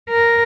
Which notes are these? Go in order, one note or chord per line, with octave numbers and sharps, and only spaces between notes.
A#4